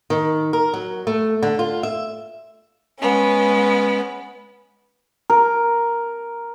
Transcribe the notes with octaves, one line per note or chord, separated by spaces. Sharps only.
D#3
A#4
F#3
A3
D3
F4
E5
G#3 B3 C#4
A#4